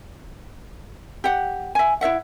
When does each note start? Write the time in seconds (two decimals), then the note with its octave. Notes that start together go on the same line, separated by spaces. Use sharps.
1.24 G4 F#5
1.75 E5 G#5
2.01 E4 C#5 E5 F#5